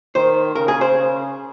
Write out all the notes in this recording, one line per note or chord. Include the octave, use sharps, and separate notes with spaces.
D#3 C5
C#3 A#4
G#4
C5
C#3